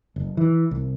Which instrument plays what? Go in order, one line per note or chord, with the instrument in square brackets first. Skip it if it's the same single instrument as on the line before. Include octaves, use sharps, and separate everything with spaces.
[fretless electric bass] F#1
E3
C2